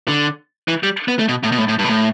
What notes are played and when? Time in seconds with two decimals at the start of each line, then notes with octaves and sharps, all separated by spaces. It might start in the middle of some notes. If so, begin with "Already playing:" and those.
0.08 D3
0.68 E3
0.83 G3
1.08 B3
1.19 A3
1.29 B2
1.43 A2
1.52 B2
1.58 A2
1.69 A2
1.79 G2
1.84 B2
1.89 A2